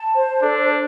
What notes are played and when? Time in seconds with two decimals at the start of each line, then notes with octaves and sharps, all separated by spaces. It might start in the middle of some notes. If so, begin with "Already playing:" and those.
Already playing: A5
0.13 C5
0.42 D4 A4